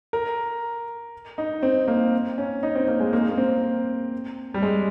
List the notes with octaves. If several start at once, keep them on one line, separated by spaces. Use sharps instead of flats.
A#4
D#4
C4
A#3
C#4
D#4
C4
A#3
G#3
A#3
A#3
C4
G3
G#3